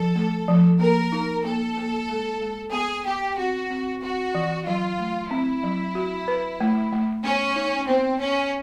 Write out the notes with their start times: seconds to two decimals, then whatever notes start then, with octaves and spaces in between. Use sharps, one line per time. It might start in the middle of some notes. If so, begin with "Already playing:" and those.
Already playing: F3 A4
0.15 A3
0.48 F3
0.80 A#3 A#4
1.12 D#4
1.44 A#3 A4
1.77 A#3
2.09 G#3
2.41 G#3
2.73 B3 G#4
3.05 B3 G4
3.37 C4 F#4
3.71 C4
4.03 C4 F#4
4.35 E3
4.66 F#3 F4
4.99 A3
5.30 C4 E4
5.64 F#3
5.95 F#4
6.28 B4
6.60 A3
6.92 A3
7.24 B3 C#4
7.56 D#4
7.88 B3 C4
8.20 B3 C#4